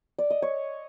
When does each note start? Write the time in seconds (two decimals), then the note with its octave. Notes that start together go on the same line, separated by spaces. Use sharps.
0.18 D5
0.30 D#5
0.42 C#5